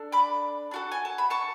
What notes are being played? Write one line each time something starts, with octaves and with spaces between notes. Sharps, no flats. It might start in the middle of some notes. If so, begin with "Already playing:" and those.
Already playing: D4 A4
B5 D6
D4 F#4 A4
G#5
A5
B5
A5 C#6